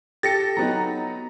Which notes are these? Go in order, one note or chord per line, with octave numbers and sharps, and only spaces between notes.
G4 A4 G5 A6 A#6 C#7
F#3 B3 D#4 A#5